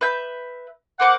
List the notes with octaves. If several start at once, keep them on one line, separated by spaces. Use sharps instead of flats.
B4 E5 G6
A#3 C5 F#5 D6